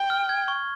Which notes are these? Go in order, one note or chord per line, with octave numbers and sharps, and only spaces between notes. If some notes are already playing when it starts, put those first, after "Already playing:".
Already playing: G5
F6
G#6
C#6